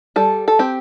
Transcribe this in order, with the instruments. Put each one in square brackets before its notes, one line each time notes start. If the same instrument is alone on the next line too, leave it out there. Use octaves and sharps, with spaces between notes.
[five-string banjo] G3 A4
A4
C4 G4